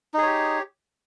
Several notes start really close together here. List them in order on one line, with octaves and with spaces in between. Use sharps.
D#4 G#4 C#5 G4